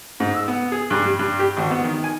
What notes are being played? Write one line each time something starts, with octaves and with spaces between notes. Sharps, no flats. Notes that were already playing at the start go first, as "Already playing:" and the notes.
G#2
E6
B3
G#4
G2
G3
G2
G4
G#1
B3
D#3
G#5